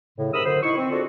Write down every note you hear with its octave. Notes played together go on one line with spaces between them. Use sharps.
A2 C#3
G#2 C3 A#4 B5 D#6 E6
F#2 D3 C5
D#4 E4 C#6
C4
C4 D4 F4 F#4 G#4 A4